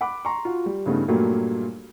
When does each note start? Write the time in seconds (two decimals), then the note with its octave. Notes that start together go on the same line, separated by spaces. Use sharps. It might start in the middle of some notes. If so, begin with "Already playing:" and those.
0.01 F#5 B5 D6
0.25 A#5 C6 C#6
0.45 F4 F#4
0.66 G3
0.86 G2 C#3 A3 B3 D#4
1.08 G2 A#2 F#3 A3 A#3 G4